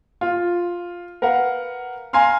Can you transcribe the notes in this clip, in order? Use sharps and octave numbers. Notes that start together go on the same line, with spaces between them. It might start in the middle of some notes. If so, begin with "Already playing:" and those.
F4
A#4 B4 F5 F#5
F5 G#5 A#5 C6 F6